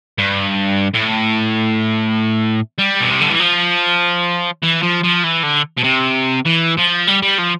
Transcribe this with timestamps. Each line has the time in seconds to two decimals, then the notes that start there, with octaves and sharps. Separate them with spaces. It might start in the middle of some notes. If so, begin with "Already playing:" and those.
0.18 G2
0.94 A2
2.78 G3
3.00 B2
3.10 C3
3.21 D3
3.29 E3
3.39 F3
4.63 E3
4.82 F3
5.03 F3
5.23 E3
5.43 D3
5.78 B2
5.84 C3
6.45 E3
6.77 F3
7.07 G3
7.23 G3
7.38 F3